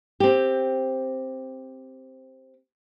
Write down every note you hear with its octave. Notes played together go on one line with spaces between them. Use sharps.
C4 G4